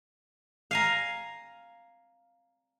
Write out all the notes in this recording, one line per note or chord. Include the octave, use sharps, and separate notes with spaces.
F5 G#5 A#5